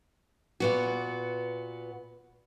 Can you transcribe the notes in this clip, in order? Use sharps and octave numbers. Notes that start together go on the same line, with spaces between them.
A#2 B3 F#4